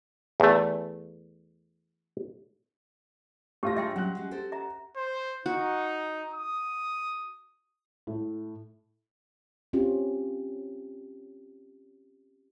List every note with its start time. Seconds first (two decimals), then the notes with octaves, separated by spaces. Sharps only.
0.40 E2 A3
3.63 A2 F4 G4 A#6
3.77 D3 G#3 E5 G5 C6
3.96 F#3 G3 C#4 F#5 F#6
4.17 G#3 F#4
4.31 G4 A4 C5
4.52 E5 A#5
4.96 C5
5.46 D#4 F#4
6.34 D#6
8.07 A2
9.73 C4 C#4 F4 G4